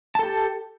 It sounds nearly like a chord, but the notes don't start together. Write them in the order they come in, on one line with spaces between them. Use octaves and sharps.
A5 A4 G4